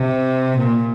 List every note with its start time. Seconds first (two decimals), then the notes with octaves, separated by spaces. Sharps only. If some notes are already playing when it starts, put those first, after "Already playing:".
Already playing: C3
0.57 A#2